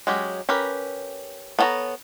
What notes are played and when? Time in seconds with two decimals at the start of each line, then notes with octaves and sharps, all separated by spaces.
0.07 F#3 G#3 C#4 G4
0.49 C#4 G4 A#4 B4
1.59 B3 D4 A4 C#5 A#5